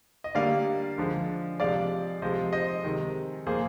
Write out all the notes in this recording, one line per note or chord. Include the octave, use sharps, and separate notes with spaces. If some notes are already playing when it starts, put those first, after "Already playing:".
D#5
D3 G3 A#3 D5 F5
D3 F3 G#3
C3 F3 G#3 D5 F5
C3 F3 G#3 C5 D#5
C5 D#5
C3 D#3 G#3
A#2 F3 A#3 G#4 C5